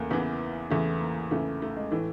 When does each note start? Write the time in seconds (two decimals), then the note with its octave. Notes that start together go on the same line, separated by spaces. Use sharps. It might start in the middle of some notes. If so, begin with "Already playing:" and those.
Already playing: E2 C#3 A3 A#3
0.11 E2 C#3 E3 B3
0.71 E2 C#3 E3 A3
1.01 A#3
1.31 E2 C#3 E3 A3
1.62 A3
1.76 G#3
1.91 A2 E3 A3